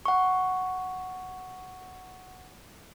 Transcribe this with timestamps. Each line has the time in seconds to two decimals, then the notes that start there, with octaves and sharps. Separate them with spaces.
0.06 F#5 C#6